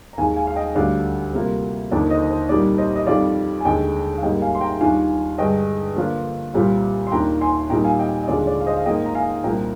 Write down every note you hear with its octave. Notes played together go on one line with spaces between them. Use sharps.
A#5
D#2 D#3 G#3 F5 G#5
F5 G#5
F5
D#5 G5
D2 D3 G3 D4 D5 F5
C3 G3 A#3 F4
D#2 D3 F3 A#3 D#4 D5
C5 D#5
C5
C2 A#2 G3 A#3 D#4 D5
C5 D#5
D#5
F2 D#3 G3 D5 F5
G#5
D#2 D3 G#3 D#5 G5
F5
G#2 G3 A#3 D#5 G5
F5 G#5
C6
G5 A#5
D#2 D#3 G3 D4 F4 F5 G#5
G2 D3 G#3 D#5 G5
D3 F3 A#3 D4 F4
C2 A#2 G3 C4 F4
C6
D#2 D#3 A#3 D4 F4 G5 A#5
G#5 C6
A#2 G3 A#3 D#4 G5 A#5
F5 G#5
D#5 G5
D#5
D#2 D3 G#3 D4 F4 D5
D5
F5
C5 D#5
F5
G#2 F3 A#3 F4 D#5 G5
A#5
F5 G#5
C2 A#2 F3 A#3 D4 G5 A#5